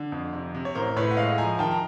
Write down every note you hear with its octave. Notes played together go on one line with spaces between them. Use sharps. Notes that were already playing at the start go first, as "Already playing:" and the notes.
Already playing: D3
F2
C3
C3
C#5
A1 A#4 C5
A2 B4 C#5
F#5
G#3 D#5 F5
F3 G#5 A#5
D#3 G5 A5
A#5